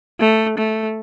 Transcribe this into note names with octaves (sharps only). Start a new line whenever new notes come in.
A3
A3